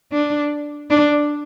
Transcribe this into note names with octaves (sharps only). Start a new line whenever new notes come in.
D4
D4